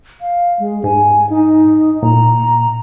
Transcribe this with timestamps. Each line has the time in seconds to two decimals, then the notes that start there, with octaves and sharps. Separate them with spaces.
0.21 F5
0.59 G#3
0.84 G#2 G#5
1.30 D#4
2.03 A#2 A#5